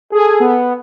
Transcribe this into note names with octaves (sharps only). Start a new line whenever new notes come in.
G#4 A4
B3